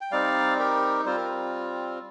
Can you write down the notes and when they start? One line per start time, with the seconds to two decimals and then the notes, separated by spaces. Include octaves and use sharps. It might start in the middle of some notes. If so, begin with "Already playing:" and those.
0.01 G5
0.11 G3 C4 D#4 D5 F5
0.59 G4 A#4
1.05 G3 C4 F4 C5
1.17 A#4